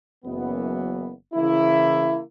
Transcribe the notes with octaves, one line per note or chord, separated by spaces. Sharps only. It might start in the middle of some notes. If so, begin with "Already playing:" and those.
F#1 F#2 E3 B3
C#3 E3 A#3 E4